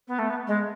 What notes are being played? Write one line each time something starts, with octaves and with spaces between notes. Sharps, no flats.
B3
A3
B3
G#3